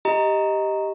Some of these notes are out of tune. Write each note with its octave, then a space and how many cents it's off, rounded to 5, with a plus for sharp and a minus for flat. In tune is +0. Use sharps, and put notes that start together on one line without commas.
G4 +0 D#5 +10 A#5 +0